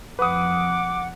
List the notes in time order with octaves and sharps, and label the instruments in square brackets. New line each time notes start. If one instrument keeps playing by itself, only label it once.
[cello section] F2 [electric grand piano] B4 D#6 [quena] F#5 [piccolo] D6